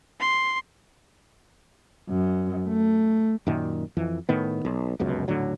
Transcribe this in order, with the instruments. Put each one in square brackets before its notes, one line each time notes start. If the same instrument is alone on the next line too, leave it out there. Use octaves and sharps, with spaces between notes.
[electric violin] C6
[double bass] F#2
A3
[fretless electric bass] F#2 A#2 D#3
F2 E3
A2 D#3 B3
B1
F1 C#2 F#2 B2
D#1 A2 D3 F#3